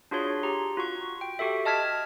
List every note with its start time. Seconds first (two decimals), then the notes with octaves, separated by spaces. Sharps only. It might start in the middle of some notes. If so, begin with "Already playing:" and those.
0.11 D4 F4 F#4 G#4 C#5 C6
0.43 G4 A#5
0.77 F4 F#4 C#6
1.21 G5
1.39 F#4 G4 A4 E5
1.65 D#5 A5 F6 G#6 B6